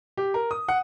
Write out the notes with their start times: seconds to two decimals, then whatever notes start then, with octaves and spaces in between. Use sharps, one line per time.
0.17 G4
0.34 A#4
0.51 D#6
0.68 F#5